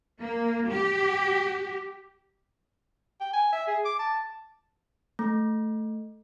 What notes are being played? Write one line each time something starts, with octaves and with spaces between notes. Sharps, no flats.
A#3
G4
G5
G#5
E5
G#4
D6
A5
A3